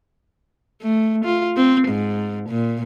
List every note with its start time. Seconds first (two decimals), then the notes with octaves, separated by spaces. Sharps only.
0.82 A3
1.25 F4
1.57 C4
1.88 G#2
2.49 A#2